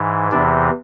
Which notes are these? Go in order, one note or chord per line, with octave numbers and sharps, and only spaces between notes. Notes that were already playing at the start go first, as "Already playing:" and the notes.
Already playing: G#2 E3
E2 C3 E3 D4